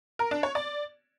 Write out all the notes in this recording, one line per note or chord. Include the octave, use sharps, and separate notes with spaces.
A#4
D4
C#5
D5